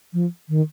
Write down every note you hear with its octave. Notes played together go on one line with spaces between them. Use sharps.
F3
D#3